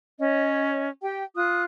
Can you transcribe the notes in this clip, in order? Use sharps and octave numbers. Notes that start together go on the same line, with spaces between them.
C#4 C#5 D#5
G4 G5
F4 D#6 F#6